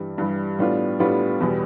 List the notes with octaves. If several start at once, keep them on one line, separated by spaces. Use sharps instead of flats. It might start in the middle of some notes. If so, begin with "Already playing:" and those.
Already playing: G2 E3 G3
G2 E3 G3
A2 G3 B3 D4 F4
A2 G3 B3 D4 F4
E2 B2 G3 B3